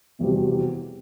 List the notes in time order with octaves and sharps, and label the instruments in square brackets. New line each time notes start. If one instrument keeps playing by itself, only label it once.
[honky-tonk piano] F1 E2 B2 G3 C4